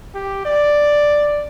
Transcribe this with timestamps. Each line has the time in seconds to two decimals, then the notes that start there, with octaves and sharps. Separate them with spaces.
0.15 G4
0.45 D5